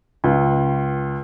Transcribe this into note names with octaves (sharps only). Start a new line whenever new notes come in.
C#2